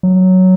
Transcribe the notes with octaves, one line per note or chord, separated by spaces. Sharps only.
F#3